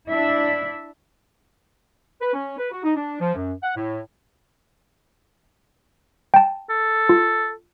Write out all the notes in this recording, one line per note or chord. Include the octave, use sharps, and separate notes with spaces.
D4 E4 E5
B4
C#4
B4
F#4
D#4
D4
F3
F#2
F#5
A2
G5 A5
A4
F4